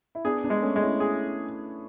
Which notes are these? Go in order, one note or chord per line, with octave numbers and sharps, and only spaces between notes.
E4
B3 D4 G#4
B3 D4
G#3
A3 C#4
G#3
C#4 E4
G#4